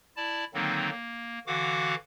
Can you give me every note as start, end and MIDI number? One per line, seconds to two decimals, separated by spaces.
0.17 0.44 64
0.17 0.44 74
0.17 0.44 81
0.54 0.90 50
0.54 0.90 51
0.54 0.90 54
0.54 0.90 58
0.54 0.90 60
0.54 0.90 63
0.91 1.39 58
1.47 1.95 50
1.47 1.95 52
1.47 1.95 66
1.47 1.95 77
1.47 1.95 78
1.47 1.95 86